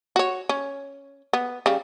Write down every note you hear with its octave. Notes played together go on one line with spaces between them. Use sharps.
F#4 C#5
C#4
B3
C#3 G3